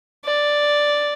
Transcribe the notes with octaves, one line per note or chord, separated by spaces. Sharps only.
D5